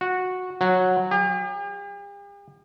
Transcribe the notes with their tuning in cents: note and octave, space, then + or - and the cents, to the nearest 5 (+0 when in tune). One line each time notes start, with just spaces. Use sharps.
F#4 -10
F#3 -10
G4 +45